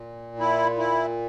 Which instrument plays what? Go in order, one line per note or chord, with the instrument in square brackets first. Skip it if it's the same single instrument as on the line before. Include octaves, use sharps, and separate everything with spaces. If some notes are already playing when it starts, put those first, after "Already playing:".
Already playing: [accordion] A#2
E4
E4